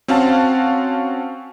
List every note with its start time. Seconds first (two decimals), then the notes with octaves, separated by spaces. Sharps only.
0.08 C4 C#4 F#4 F5 F#5 A5